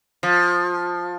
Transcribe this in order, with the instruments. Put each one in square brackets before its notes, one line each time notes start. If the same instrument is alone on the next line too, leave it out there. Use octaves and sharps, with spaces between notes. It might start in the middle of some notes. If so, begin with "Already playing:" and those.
[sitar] F3